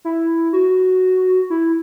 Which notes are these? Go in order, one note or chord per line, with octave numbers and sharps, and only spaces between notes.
E4
F#4
E4